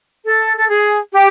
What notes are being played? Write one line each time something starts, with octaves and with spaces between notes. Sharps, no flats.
A4
A4
G#4
G4